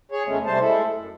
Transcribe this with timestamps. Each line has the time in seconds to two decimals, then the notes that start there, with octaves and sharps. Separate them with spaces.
0.12 G#4 C#5
0.26 E2 C#3 G#3 A3 C#4
0.46 C3 G3 A3 C5 A5
0.60 G#3 A3 E4 A4
0.93 F#2